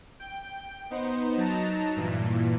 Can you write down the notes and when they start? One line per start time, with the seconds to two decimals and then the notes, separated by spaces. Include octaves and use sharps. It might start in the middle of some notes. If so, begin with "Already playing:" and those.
0.20 G5
0.90 B3 D#4 C5
1.37 F#3 D#4 A5 A#5
1.96 G2 A#2 E3